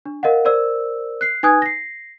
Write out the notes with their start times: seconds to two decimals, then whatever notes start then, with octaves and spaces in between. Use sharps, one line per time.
0.05 D4
0.23 A#4 D#5 F5 F#5
0.45 A#4 C5 D5 E6
1.21 F#6 C7
1.43 D#4 B4 G#5 D#6 F#6 G#6
1.62 A#6 C7